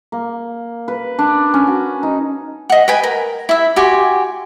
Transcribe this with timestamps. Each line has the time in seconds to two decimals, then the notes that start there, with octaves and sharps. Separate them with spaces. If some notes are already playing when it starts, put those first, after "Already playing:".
0.12 A#3
0.88 B4
1.19 D4
1.54 C#4
1.67 F#4
2.03 D#4
2.70 D#5 F#5
2.88 B4 G5 G#5 B5
3.03 A#4
3.49 E4 E5
3.76 F#4 G4 G#5 C6